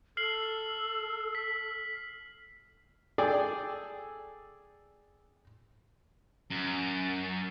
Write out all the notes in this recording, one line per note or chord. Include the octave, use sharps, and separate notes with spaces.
A4 F6 C7 F#7
B6
G#4 A4 D5 G5
F#2